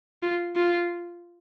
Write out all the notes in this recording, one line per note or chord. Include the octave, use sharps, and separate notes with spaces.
F4
F4